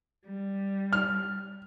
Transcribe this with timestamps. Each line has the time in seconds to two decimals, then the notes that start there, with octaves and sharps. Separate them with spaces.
0.24 G3
0.93 F6